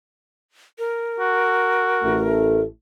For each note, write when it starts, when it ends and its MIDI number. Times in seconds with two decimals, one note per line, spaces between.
0.79 2.60 70
1.20 2.23 66
2.03 2.63 33
2.03 2.63 57